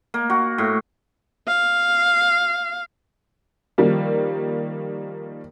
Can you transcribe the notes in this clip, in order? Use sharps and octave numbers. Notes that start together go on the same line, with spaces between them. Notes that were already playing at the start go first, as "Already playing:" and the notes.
A#3
F#4
A2
F5
D#3 F3 G3 A#3